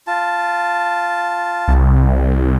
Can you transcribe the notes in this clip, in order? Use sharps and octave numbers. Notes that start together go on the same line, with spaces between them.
F4 A5
C2